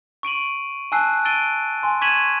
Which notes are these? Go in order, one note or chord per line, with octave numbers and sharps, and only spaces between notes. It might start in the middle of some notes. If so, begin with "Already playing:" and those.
C#6 D7 D#7 F#7
G#5 A5 E6 F#6 C7
E6 A6 D7 D#7 G7
G#5 C6
C#6 G#6 B6 D#7 E7 F#7